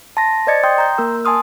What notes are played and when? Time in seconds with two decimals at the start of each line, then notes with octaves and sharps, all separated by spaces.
0.17 A5 C6 A#6
0.47 C5 D5 D#5 G#6 A6 C#7
0.63 G5 C6 D#6 G6
0.78 A#5 C6 G6
0.98 A#3 A#4 E6
1.25 G#5 A5 C6 D#6 F6